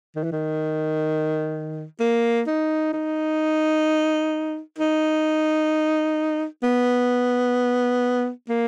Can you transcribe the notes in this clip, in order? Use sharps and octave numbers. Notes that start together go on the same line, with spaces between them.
D#3
E3
D#3
A#3
D#4
D#4
D#4
B3
A#3